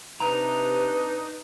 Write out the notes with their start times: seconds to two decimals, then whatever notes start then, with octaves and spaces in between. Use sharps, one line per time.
0.20 C3 D4 D#4 B4 A#5